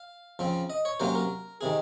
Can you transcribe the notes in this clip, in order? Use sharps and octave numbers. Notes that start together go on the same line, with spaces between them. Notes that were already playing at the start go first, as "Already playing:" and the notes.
Already playing: F5
C#3 F3 C4
D#5
C#5
C3 F#3 A#3 C#4 C5
A#4
C3 D#3 G#4